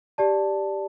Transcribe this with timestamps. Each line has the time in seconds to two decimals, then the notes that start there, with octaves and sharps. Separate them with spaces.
0.18 G4 D5 A5